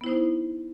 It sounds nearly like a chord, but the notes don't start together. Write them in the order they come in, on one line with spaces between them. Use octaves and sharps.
B3 E4 C5 D#4